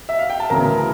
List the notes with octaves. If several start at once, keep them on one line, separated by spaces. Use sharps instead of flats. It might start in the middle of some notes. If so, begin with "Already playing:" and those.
E5
F5
G5
A5
D2 C#3 E3 A#4 A#5